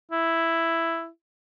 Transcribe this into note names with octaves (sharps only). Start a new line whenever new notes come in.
E4